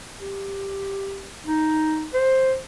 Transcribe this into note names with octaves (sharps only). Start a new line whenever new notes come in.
G4
D#4
C5